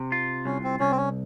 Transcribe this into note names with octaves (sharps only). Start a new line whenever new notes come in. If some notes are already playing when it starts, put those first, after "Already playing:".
Already playing: C3
F4
C2 C#4
C4
C2 C#4
C4
C#4